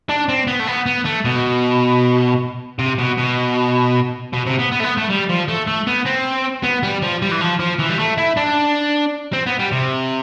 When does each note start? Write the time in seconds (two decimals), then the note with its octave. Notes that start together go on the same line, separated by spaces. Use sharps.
0.09 D4
0.29 C4
0.47 B3
0.60 A3
0.67 B3
0.86 B3
1.05 A3
1.25 B2
2.79 C3
2.98 B2
3.18 B2
4.33 B2
4.46 C3
4.59 B3
4.71 B3
4.80 A3
4.83 B3
4.97 A3
5.10 G3
5.29 F3
5.48 A3
5.67 A3
5.87 B3
6.06 C4
6.64 B3
6.83 G3
7.02 F3
7.22 G3
7.32 E3
7.41 F3
7.60 F3
7.79 E3
7.89 G3
7.99 A3
8.18 E4
8.37 D4
9.33 C4
9.46 B3
9.59 G3
9.72 C3